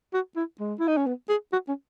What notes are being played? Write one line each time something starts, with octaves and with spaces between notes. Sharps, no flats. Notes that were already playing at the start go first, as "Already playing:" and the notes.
F#4
E4
G#3
E4
D#4
C#4
B3
G#4
F#4
C#4